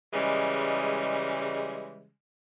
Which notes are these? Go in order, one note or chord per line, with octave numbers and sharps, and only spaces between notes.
C#3 E3 G3 G#3